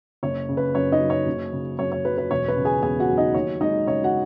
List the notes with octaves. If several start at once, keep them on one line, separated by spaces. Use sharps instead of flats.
F#1 C#5
C#3
B4
F#2 C#5
D#4 D#5
F#3
C#5
F#1
C#3
F#2 C#5
C#5
F#3 B4
B4
E1 C#5
B4
C#3
G#4 G#5
E2 G#4 G#5
F#4 F#5
F#3
D#4 D#5
D#2 C#5
G#3 D#4 D#5
C#3 C#5
F#4 F#5